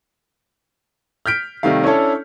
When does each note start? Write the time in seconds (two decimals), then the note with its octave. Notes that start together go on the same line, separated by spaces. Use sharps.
1.26 F6 G6 B6 D7
1.63 C3 D#3 G3 A3 F5
1.84 C#4 D4 E4 A4 C#5